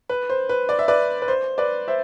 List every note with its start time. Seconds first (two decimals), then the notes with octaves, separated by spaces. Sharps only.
0.10 B4
0.30 C5
0.49 B4
0.69 D5
0.79 E5
0.88 B4 D5
1.22 B4
1.28 C5
1.58 B4 D5
1.88 C5 E5